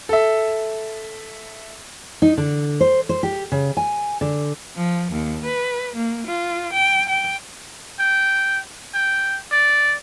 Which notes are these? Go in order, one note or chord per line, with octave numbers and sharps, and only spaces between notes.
A4 E5
D#4
D3
C5
C5
G4
C#3
G#5
D3
F3
D#2
B4
A#3
F4
G5
G5
G5
G5
D5